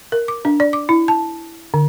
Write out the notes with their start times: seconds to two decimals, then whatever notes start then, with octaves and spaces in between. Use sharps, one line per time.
0.12 A#4
0.28 D6
0.45 D4
0.60 D5
0.73 D6
0.89 E4
1.08 A5
1.74 D3